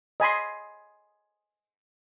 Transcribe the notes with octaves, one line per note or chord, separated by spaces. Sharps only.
D#5 G#5 B5 C6